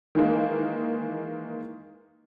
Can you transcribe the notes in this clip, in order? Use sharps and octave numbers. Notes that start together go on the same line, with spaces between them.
D#3 E3 G#3 A#3